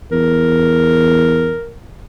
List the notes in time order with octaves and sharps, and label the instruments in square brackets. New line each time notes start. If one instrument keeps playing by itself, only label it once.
[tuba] E2 [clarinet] A#4